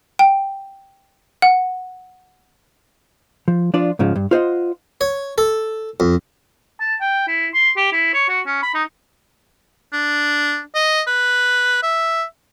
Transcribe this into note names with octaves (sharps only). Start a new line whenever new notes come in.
G5
F#5
F3
F3 D4 F4 D5
G#2 C#3 F3
G2
F4 C5 D#5 F#5
C#5
A4
F2
A5
G5
E4
C6
G4
E4
C#5
F#4
C#4
B5
D#4
D4
D#5
B4
E5